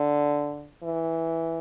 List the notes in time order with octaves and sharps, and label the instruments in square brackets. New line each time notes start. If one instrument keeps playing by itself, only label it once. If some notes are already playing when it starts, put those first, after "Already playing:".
Already playing: [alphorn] D3
E3